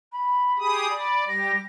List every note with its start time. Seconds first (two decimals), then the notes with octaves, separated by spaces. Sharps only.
0.12 B5
0.59 G4 G#4 D#6
0.90 D5 B5
1.28 G3 G4 A#6